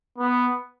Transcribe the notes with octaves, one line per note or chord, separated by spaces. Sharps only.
B3